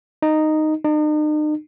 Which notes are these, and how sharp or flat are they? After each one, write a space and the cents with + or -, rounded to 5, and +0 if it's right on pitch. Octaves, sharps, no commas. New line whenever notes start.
D#4 -10
D#4 -45